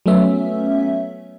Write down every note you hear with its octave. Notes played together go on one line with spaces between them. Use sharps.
F#3 A3 B3 C#4 E5